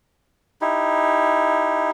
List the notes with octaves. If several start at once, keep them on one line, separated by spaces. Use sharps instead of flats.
D#4 E4 G4